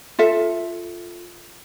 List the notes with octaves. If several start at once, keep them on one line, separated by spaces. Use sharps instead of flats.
F4 A4 E5